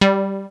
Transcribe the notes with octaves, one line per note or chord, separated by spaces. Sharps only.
G3